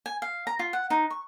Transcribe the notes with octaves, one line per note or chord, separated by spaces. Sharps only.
G#5
F5
A#5
F4
F#5
D#4
C#6